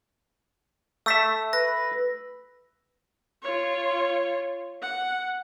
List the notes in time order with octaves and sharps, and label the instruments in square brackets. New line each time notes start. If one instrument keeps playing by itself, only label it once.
[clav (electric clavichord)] A3 E5 [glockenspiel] E6 B6
[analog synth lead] B4 [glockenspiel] A#6
[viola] F4 C#5
F#5